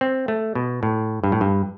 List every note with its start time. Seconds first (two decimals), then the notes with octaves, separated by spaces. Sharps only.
0.01 C4
0.28 A3
0.55 B2
0.83 A2
1.24 G2
1.32 A2
1.41 G2